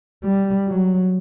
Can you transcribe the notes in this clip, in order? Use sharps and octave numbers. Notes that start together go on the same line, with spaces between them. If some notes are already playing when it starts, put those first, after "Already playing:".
G3
F#3